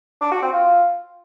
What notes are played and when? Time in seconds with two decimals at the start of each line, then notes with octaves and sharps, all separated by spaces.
0.21 D4
0.32 F#4
0.42 C4
0.53 F4